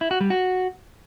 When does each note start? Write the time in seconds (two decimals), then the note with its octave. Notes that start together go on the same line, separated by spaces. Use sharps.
0.01 E4
0.11 F#4
0.21 G3
0.30 F#4